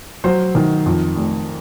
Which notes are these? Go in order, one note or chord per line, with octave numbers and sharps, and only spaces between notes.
F#3 C5
D#3
F2
F1